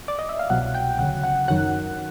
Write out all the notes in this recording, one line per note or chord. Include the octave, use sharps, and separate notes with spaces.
D5
D#5
E5
F5
C2 B2 F#3 F#5
G5
D2 C#3 F#3 F#5
F#5
F#2 D#3 F#3 F#5